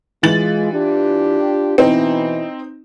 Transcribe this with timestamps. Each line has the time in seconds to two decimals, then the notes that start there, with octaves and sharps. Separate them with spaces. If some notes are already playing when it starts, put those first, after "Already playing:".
0.23 E3 G#3 F4 A6 F#7
0.72 D4 F4 G4
1.78 B2 E3 C4 D#4 E4